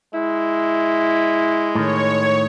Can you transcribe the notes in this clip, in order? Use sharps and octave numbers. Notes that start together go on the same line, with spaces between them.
G#3 E4
A2 D#3 C#5